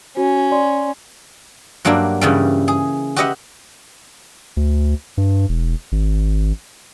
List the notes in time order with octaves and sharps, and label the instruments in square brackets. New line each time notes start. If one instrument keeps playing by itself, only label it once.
[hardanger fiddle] C#4 [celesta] F#4
[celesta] D5 C6
[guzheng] G2 F#3 A#3 D4 E5
G2 C#3 E3 G3
G#4
F#4 G4 B4 D#5 E5 F#5
[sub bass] D2
G2
E1
G#1